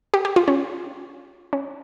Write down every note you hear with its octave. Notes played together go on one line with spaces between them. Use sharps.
G4
G4
F4
C#4
C#4